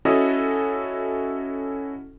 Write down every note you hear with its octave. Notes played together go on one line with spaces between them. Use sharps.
C#4 E4 F#4 A4 D#5